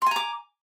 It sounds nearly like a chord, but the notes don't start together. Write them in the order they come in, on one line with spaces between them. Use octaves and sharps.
C6 G#5 A#5 D6